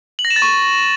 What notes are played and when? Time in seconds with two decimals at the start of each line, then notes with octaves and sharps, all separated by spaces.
0.19 F#7
0.25 A#6
0.30 E7
0.36 A6
0.42 C#6